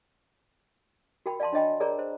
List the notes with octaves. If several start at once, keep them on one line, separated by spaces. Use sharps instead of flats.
F#4 A#4 G5 B5
D5 F5 A5 C6
D4 C#5 D#5 G5 B5
G#4 A#4 C#5 D5 A#5
C5